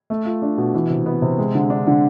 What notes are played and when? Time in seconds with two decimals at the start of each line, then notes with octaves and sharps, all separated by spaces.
0.10 A3
0.25 F4
0.42 D4
0.57 B2
0.74 E3
0.90 C3
1.06 B3
1.22 C3
1.38 G#3
1.54 D3
1.70 D4
1.87 D3